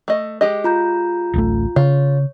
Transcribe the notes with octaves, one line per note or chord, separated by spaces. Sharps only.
A3 D#5
G#3 G4 D#5
F4 A#5 G6
D1 A1 A3
C#3 F4 C#5